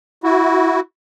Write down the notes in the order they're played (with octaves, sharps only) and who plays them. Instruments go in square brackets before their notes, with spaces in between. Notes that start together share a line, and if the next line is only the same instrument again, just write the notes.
[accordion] E4 F#4